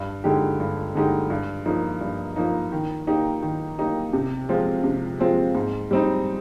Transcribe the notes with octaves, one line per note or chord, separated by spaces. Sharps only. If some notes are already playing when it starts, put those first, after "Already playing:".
Already playing: G2
D3 G#3 D#4 G4
G2
D3 G#3 D#4 G4
G2
F3 A#3 D#4
G2
F3 A#3 D#4
D#3
A#3 D#4 G4
D#3
A#3 D#4 G4
C3
F3 G#3 C4 F4
C3
F3 G#3 C4 F4
G#2
G3 C4 D#4